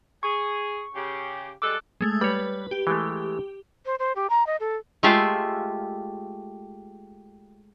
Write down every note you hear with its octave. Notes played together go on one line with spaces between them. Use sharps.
G#4 C#6
C#3 G4
G3 G#3 A4 D6 E6 F#6
G#3 A3
G3 B4 C#5
G4
E3 G#3 A3
C5
C5
G4
A#5
D#5
A4
G#3 A3 F4 G4 E5 F5